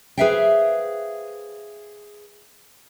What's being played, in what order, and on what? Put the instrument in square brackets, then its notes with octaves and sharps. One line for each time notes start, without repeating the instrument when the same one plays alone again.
[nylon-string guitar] G#4 B4 C5 E5 F5 G5